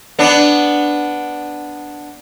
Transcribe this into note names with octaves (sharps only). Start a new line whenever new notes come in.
B3 D4